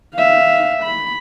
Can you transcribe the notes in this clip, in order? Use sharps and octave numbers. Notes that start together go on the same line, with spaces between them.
E5 F5
B5